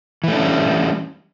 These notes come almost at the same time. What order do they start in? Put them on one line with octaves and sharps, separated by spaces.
E3 A3 D4 C#4 G3